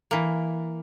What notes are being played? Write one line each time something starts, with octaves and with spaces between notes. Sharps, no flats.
E3 A#3